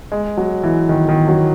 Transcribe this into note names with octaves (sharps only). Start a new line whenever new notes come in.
G#3
F#3
E3
D#3
D#3
F#3